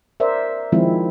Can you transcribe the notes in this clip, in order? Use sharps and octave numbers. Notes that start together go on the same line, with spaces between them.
A#4 C5 D5 E5
D#3 F3 G#3 C4 E4